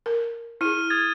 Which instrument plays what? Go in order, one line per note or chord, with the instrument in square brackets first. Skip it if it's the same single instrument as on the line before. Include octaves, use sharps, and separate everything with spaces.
[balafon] A#4
[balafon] E4 G#4 [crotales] F6 D#7
[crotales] D#6 G#6 A6